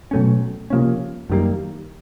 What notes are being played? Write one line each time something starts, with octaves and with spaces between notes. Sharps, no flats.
B2 F#3 A3 C#4
C3 F3 A#3 C#4
F#2 D#3 G3 A#3